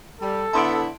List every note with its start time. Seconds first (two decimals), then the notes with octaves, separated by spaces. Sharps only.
0.21 G3 A4
0.53 D3 B3 E4 A5 C6 D7